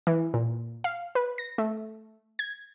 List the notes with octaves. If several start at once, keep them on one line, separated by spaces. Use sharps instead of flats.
E3
A#2
F5
B4
A#6
A3
G#6